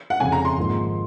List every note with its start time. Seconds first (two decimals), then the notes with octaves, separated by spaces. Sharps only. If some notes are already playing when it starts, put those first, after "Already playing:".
0.10 F#5
0.20 F2 C#3 F3 G#5
0.32 A#5
0.45 C6
0.57 G#1 G#2 F3 A#3